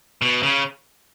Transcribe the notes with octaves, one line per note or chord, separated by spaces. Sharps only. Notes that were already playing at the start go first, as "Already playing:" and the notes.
B2
C#3